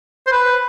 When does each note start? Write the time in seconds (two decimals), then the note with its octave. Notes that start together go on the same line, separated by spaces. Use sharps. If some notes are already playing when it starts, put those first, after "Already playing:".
0.27 C5
0.32 B4